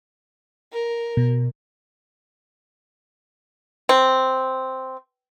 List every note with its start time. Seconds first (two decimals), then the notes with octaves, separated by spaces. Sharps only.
0.72 A#4
1.17 B2
3.89 C4